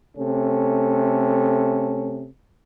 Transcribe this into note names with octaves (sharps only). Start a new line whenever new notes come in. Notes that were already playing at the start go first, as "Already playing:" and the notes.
C3 A3 C#4 A4